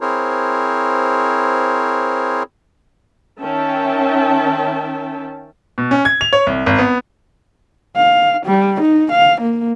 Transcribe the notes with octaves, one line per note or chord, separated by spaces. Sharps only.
C4 E4 G#4 A#4 C5 C#5
D#3 C#4 E5 G5 A5
B2
C#4
G#6
F7
C#5
C2
G#1
B3
F5
G3
D#4
F5
A#3